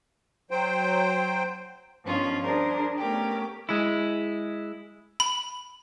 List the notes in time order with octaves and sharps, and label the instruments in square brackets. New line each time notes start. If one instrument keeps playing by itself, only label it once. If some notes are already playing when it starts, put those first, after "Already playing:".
[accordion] F#3 C5 G5
[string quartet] G2 D#3 F3 B3 C#4 F4
G3 D4 G#4 A#4 C5
A3 B3 C#4 G4 A#4
[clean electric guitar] G#3 E4
[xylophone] B5